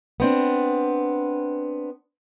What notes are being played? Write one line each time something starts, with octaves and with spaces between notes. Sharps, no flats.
B3 C4 D4